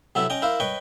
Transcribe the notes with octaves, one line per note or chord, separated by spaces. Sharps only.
C3 F#3 B3 E4 A4
C#4 D#5 G5 A#5
E4 A#4 C5 F5
B4 C#5 D#5 G5 C#6